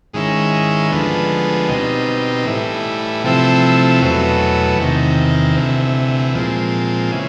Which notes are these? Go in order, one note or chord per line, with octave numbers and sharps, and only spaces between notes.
G#2 D#3 G#3 C#4 E4
D2 D3 F3 G#3 B3
B2 G3 C4 D#4
A2 E3 G3
C3 F3 A3 C4 E4
E2 B2 F#3 A3
E2 C3 D#3
D2 C3 E3
A#2 F3 G#3 C4
C#3 E3